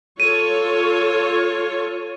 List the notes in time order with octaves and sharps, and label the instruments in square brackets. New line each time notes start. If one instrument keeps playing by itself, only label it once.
[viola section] F4 A4 C#5 [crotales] D#7